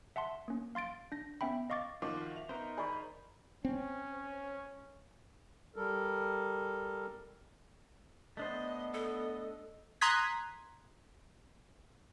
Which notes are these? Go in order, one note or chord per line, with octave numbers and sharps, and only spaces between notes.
E5 F#5 A5 C6
A#3 C#4
F5 C6 A6 D7
D4 A#6
B3 C#4 E5 G5 B5
D#5 F5 C#6 D6 A6
D#3 F3 A#3 F4 F#4 D#5 D6
E5 F7
B3 D#4 A#4 C5
G#4 D5 D#5 B5 C#6
C4 C#4
G3 A4 A#4
A3 B3 D4 C5 D#5
A4 D#5
A#5 C6 D#6 F#6 G#6 B6